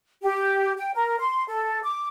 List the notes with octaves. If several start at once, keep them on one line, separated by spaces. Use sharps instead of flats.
G4
G5
A#4
C6
A4
D6